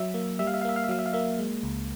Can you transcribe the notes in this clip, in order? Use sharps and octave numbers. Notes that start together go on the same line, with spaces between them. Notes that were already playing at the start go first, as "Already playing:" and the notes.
Already playing: F#3 E5
A#3
G3 E5
F5
E5
F5
A#3 E5
F5
E5
F#3 F5
E5
F5
A#3 E5
G#3
C#2